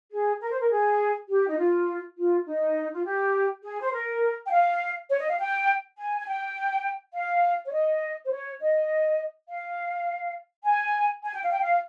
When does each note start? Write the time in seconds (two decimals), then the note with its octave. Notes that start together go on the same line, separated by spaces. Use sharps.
0.12 G#4
0.41 A#4
0.51 C5
0.61 A#4
0.71 G#4
1.29 G4
1.48 D#4
1.59 F4
2.17 F4
2.46 D#4
2.93 F4
3.05 G4
3.63 G#4
3.81 C5
3.93 A#4
4.46 G5
4.51 F5
5.09 C#5
5.19 D#5
5.29 F5
5.39 G5
5.97 G#5
6.19 G#5
6.27 G5
7.14 F5
7.66 C#5
7.73 D#5
8.25 C5
8.31 C#5
8.61 D#5
9.49 F5
10.65 G#5
11.24 G#5
11.34 G5
11.44 F5
11.52 G5
11.60 F5